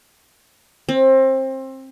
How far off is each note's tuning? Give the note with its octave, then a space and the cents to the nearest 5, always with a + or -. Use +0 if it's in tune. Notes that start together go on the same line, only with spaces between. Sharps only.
C4 +25